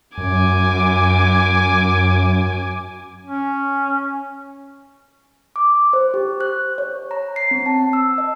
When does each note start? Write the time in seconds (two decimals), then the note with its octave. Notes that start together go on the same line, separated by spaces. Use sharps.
0.18 F#2 G#5 D6
3.27 C#4
5.56 D6
5.93 C5
6.14 G4
6.41 F#6
6.78 C#5
7.11 A#5
7.36 C7
7.51 C4
7.66 A5
7.93 E6
8.18 D#5